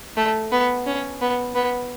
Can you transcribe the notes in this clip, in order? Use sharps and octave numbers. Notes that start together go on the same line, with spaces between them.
A3
B3
C#4
B3
B3